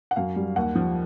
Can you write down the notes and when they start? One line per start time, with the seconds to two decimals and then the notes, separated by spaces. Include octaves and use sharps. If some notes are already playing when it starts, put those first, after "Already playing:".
0.11 F#5
0.16 F#2 F5
0.36 G3
0.56 D#2 F#5
0.75 F3